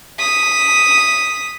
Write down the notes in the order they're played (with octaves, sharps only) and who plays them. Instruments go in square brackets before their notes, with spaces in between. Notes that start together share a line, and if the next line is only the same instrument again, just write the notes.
[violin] D#6 B6